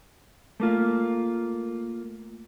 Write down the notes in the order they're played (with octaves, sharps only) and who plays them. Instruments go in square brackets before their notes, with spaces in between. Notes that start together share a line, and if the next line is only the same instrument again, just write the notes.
[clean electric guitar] A3 A#3 F4